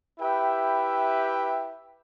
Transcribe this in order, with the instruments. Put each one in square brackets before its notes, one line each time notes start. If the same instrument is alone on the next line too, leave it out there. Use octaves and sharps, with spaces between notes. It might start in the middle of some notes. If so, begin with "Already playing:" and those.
[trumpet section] E4 G4 B4 E5 G5